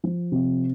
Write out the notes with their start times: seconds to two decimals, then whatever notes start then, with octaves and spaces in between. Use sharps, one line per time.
0.04 F3
0.32 C3